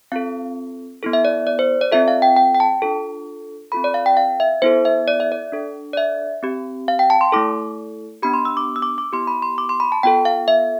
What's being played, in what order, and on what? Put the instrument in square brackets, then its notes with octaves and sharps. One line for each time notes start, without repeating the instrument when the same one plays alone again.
[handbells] C4 F4 A4 F5
B3 E4 A4
E5
D5
D5
C5
D5
C4 F4 A4 E5
F5
G5
G5
G5
A5
D4 F4 A4
C4 F4 A4 B5
D5
F5
G5
F5
E5
B3 E4 A4 C5
E5
D5
E5
D5
D4 A4
D5
E5
C4 G4
F5
G5
A5
C6
A3 E4 A4 D6
B3 D4 G4 B5
C6
E6
D6
E6
D6
D6
B3 E4 G4 C6
B5
C6
D6
C6
B5
A5
B3 F4 A4 G5
F5
E5